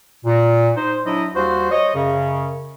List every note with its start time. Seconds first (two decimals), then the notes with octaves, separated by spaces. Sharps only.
0.24 A#2
0.76 D#4 C5
1.05 F#3 D4 E4 D#5
1.35 D#2 G3 F#4 C5
1.72 C#5 D#5
1.93 F#2 C#3